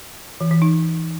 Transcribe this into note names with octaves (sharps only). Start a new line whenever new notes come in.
E3
E3
D#4